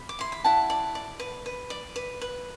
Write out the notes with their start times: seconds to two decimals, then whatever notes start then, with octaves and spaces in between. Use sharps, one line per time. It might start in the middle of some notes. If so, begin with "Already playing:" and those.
Already playing: B5
0.09 D6
0.19 E4 C6
0.32 B5
0.44 E4 F#5 A5
0.70 D5
0.95 D5
1.20 B4
1.46 B4
1.70 D5
1.96 B4
2.21 B4